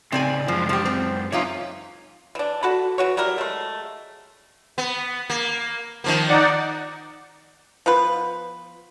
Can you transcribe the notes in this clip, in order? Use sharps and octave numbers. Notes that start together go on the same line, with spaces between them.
A2 C#3 C4 D#4 D5 G#5
F#2 F3 G#3
F3 G4
C4
E3 C4 C#4 D#4 F4 C#5
E3 D4
F#4 A4 B5
E3 F#4 C#5
F#3 G3 E4 A#4
G#3 A3
B3
A#3
D#3 F3 A#3
D#4 D5 F#5
F3 B3 F4 B4